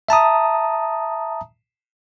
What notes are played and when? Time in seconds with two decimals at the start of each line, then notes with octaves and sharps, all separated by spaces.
0.09 E5 A5 A#5 D#6